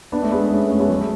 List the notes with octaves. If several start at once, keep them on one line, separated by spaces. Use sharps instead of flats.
B3 D4
A3
G#3 B3
A3 C#4
A3 C#4
G#3 B3
F#3 A3